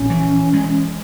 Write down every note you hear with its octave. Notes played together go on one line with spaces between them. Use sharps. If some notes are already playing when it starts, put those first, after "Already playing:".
Already playing: A#1 C#4
E3
G#3